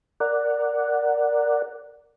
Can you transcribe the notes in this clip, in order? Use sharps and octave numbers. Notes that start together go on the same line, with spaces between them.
A#4 D5 F#5